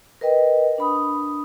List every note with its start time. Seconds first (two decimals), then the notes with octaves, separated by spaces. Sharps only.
0.21 A#4 B4 D#5 G5
0.78 D4 B5 D#6